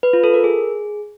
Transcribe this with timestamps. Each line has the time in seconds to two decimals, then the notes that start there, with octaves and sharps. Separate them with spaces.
0.03 B4
0.13 F4
0.24 A4
0.34 A#4
0.44 G#4